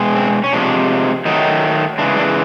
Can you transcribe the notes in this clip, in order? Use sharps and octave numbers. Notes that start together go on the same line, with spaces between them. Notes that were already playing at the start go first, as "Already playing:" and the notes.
Already playing: B2 G#3
C4
C#4
C3 F3 G#3 D4
D#3 F#3 A3 D#4
C#3 E3 G#3 D4
D4